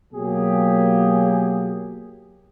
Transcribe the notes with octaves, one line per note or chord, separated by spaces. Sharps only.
B2 F#3 A#3 G4 G#4